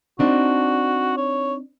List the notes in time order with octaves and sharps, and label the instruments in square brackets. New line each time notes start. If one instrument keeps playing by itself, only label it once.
[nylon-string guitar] C4 D4 D#4 [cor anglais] F#4
[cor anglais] C#5